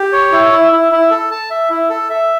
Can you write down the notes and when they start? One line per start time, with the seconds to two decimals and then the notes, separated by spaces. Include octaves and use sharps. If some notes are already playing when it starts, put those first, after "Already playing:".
Already playing: G4
0.13 C#5
0.32 E4
0.52 E4
0.72 E4
0.92 E4
1.11 A4
1.31 A5
1.51 E5
1.70 E4
1.90 A4
2.10 E5